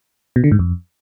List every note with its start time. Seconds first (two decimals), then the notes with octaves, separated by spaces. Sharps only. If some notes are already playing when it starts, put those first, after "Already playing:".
0.36 B2
0.44 D3
0.51 G#2
0.59 F2